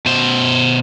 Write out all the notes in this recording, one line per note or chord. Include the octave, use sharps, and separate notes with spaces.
B2 C5